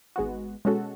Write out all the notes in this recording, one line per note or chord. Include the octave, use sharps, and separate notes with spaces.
G#1 G#2 G#3 B3 F#4
B2 G#3 C#4 F#4 A4